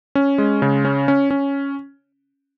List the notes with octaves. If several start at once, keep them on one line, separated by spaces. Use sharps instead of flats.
C#4
G#3
C#3
C#4
C#4
C#4